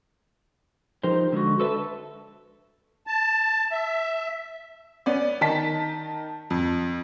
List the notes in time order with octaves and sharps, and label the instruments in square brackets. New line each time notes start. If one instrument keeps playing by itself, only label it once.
[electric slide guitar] F3 D#4 G4 A#4 C5
D3 G#3 F4 F#4
A4 B4 D#5 E5 A5
[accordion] A5
E5
[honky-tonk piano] B3 C#4 D5
D#3 D#4 A5 B6
F2